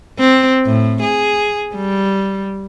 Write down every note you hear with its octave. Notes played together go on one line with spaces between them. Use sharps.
C4
A2
G#4
G3